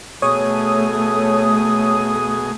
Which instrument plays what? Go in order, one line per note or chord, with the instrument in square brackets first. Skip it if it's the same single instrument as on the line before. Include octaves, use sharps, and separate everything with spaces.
[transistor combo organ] B2 G#4 [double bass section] A3 [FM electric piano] C#5 [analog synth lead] D#6